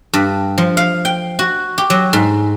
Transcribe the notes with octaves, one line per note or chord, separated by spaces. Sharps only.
G2
F3
F5
G5
F#4
G4
F#3
G#2